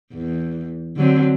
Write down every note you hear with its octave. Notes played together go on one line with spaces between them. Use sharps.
E2
D3 F#3 C4